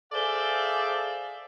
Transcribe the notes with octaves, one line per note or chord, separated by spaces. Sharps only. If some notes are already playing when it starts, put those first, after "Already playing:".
G#4 A4 C5 D5 E5 F5